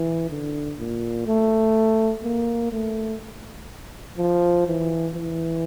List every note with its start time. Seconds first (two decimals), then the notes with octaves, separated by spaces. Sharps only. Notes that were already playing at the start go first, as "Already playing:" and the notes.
Already playing: E3
0.29 D3
0.79 A#2
1.27 A3
2.23 A#3
2.72 A3
4.18 F3
4.66 E3
5.15 E3